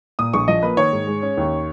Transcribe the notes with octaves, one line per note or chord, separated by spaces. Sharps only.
A#2 D#6
A#1 C#6
F3 D#5
A#3 B4
D#3 C#5
G#2
G#3
C#4
D#2